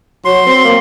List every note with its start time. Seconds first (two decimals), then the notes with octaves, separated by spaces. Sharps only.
0.25 F#3 C6
0.46 C4
0.64 A#3